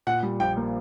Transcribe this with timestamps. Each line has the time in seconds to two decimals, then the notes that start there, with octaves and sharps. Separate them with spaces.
0.07 A#2 F#5
0.23 G3
0.40 A#1 G5
0.57 A#3